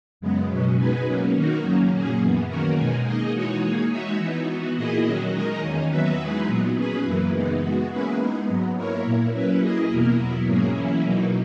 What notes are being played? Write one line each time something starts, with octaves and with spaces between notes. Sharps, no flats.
F#2 C#3 G#3 B3
B2 F#3 C#4
G#3 B3 D#4 G#4 B4
F#3 A#3 C#4
D#3 A#3 D#4 F#4 A#4
F#2 C#3 F#3 A#3 C#4
A#2 F#3 A#3 C#4 G#4
F#2 E3 B3
D#3 A#3 C#4 F#4 A#4
B2 G#3 D#4 G#4
A#3 D#4 G#4 D#5
E3 G#3 D#4 F#4 C#5
A#3 D#4 G#4
G#3 D#4 F#4 C#5 E5
E3 B3 D#4
E3 B3 F#4
A#2 A#3 E4 G#4 D#5
D#3 F#3 C#4 F#4
G#3 D#4 A#4 D#5
E2 D#3 A#3 C#4
F#3 B3 F#4 B4 E5
E3 G#3 D#4 G#4 B4
A#2 F#3 B3
F#3 C#4 G#4 B4
F#2 C#3 E3 A#3 E4
E3 G#3 B3 D#4
G#3 B3 F#4
A#3 C#4 E4 G#4 B4
G#3 B3 D#4
G#2 F#3 B3
A#3 E4 A#4 C#5
A#2 A#3 E4
F#3 C#4 E4 B4
A#3 E4 G#4 D#5
E2 B2 A#3 E4 A#4
F#3 B3 E4
G#2 F#3 A#3 C#4 G#4
E3 A#3 C#4 E4
B2 F#3 A#3 D#4